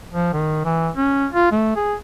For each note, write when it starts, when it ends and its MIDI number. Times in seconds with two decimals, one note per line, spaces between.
0.13 0.32 53
0.33 0.61 51
0.65 0.90 52
0.96 1.26 61
1.31 1.50 65
1.52 1.74 57
1.76 1.94 68